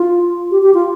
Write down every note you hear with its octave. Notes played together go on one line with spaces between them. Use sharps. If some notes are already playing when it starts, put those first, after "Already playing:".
Already playing: F4
G4
G4
F4